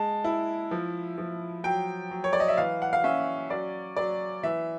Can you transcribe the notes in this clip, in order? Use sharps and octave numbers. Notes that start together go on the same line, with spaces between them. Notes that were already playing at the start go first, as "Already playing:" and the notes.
Already playing: G#3 A5
E4
F3
F3
F#3 G5
F#3
C#5
D5
D#5
E5
E3 F5
F#5
F5
C#4 E5
F#3 D5
F#3 D5
E3 E5